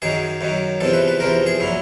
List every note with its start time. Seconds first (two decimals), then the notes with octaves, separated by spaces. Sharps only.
0.02 F#2 D#3 F#3 G#4
0.41 F#2 D#3 F#3
0.81 E2 C3 F3 A4
0.93 B4
1.08 B4
1.20 E2 C3 F3 A#4
1.46 G#4
1.60 A#2 F#3 E4